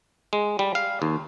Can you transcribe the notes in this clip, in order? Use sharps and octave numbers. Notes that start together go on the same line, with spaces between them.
G#3
G3
F5
D#2